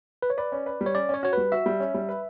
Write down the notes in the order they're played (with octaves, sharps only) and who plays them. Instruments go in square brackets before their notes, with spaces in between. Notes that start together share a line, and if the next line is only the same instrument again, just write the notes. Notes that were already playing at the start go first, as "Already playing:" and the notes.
[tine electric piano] B4
C#5
[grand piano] B4 [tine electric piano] D5
[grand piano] C#4
B4
G3
[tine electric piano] C#5
[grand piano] C#4 [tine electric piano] D5
[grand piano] C#4 [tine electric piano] C#5
[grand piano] F#4 [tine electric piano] C#5
[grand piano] G3 [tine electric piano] B4
[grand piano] F#4 [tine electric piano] E5
[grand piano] G3
C#4
G3
B4